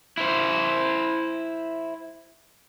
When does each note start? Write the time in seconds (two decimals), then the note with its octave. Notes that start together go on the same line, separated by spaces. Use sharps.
0.17 E4 C5